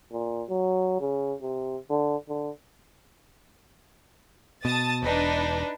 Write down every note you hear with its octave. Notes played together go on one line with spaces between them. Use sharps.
A#2
F#3
C#3
C3
D3
D3
B2 A5 D#6 A6
E1 D4 D#4 B4